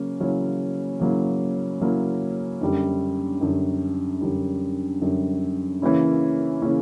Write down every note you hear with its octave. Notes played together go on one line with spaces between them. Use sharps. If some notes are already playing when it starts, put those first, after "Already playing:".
Already playing: C#3 F#3 A#3 C#4
C#3 F#3 A#3 C#4 E4
C#3 F#3 A#3 C#4 E4
C#3 F#3 A#3 C#4 E4
F#2 D3 G3
F#2 D3 G3
F#2 D3 G3
F#2 D3 G3
C#3 E3 A#3 C#4 E4
C#3 E3 A#3 C#4 E4